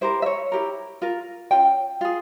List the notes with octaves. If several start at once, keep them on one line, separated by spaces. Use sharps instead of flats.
E4 G4 A#4 C5
E5
C#5
E4 G4 A#4
F4 A#4
C#4 F4 G5
F4 G#4